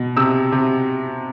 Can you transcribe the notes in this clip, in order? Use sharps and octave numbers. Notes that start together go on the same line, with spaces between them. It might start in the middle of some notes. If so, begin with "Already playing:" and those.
Already playing: B2
C3 E6
C3